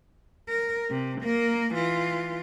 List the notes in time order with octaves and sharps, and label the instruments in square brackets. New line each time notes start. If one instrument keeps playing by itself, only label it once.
[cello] A#4
C3
A#3 A#4
E3 F4